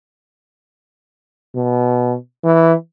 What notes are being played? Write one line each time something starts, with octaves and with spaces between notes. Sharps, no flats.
B2
E3